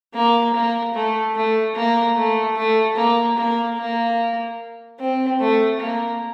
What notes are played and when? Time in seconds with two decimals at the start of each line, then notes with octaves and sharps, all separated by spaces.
0.14 A#3
0.54 A#3
0.94 A3
1.35 A3
1.75 A#3
2.16 A3
2.56 A3
2.97 A#3
3.37 A#3
3.78 A#3
4.99 C4
5.40 A3
5.80 A#3